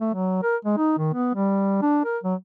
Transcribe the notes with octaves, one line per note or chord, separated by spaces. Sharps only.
A3
F#3
A#4
G#3
D#4
D#3
B3
G3
D4
A#4
F#3